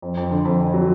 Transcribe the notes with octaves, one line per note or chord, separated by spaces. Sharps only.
F2
F2
D3
F2
F2
F#3